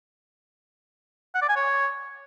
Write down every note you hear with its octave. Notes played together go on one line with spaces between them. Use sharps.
F#5
D5
G#5
C#5